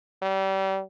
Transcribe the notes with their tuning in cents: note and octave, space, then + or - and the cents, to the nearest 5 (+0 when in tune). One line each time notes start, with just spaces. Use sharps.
G3 -30